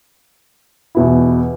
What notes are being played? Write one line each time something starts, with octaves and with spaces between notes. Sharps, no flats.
E2 B2 B3 E4